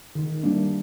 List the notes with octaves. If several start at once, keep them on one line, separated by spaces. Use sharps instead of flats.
D#3
G3 A#3 D4